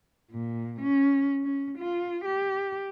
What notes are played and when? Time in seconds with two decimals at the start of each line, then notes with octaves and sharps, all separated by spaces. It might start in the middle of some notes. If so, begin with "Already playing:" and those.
0.31 A#2
0.82 C#4
1.43 C#4
1.78 F4
2.25 G4